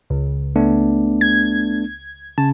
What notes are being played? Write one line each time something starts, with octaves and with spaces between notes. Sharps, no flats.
C#2
A3 B3 D4
G#6
C#3 A5